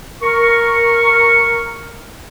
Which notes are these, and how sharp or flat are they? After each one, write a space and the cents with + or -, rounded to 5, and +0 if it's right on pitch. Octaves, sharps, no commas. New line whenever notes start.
A#4 +0 C#6 +0